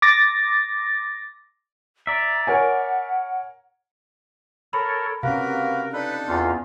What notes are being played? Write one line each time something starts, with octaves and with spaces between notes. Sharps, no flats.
D6 A6 A#6
D5 E5 A#5
A#4 C#5 F#5 G#5
A4 A#4 C#5 B5
C3 A#3 C#4 F#4 A#4 B4 F5
D4 D#4 A4 B4
E2 F4